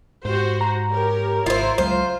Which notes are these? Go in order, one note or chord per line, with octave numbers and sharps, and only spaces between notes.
G#2 F#4 G4 C5
A#5
G4 A#4 C#5
G#1 E4 F4 C5
C#2 F#3 G#3 F4 C5